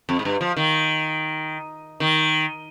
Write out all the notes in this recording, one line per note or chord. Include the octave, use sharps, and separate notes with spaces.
F2
G#2
G2
F3
D#3
D#3